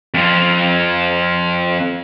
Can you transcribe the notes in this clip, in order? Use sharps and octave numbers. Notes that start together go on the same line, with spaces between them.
F2 F3